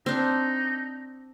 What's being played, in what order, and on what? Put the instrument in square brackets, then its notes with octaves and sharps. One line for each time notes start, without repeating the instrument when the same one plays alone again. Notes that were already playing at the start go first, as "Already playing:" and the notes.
[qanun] C4 D4 [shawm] D#4